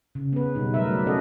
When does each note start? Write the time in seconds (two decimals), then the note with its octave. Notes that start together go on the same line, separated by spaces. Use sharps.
0.15 C#3
0.33 B3 B4
0.55 B2 G3 D#4
0.74 F#3 A3 A#4 B4 E5
0.88 F#3 D5
1.06 C#4 A4 D5 D#5 F#5